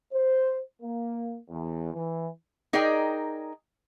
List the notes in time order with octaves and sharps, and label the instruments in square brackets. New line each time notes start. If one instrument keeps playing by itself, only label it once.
[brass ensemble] C5
A#3
E2
E3
[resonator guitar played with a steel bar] D#4 G#4 A#4 D5 D#5 G5